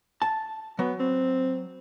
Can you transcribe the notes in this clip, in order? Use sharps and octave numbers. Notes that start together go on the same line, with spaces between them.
A5
F#3 B3
C4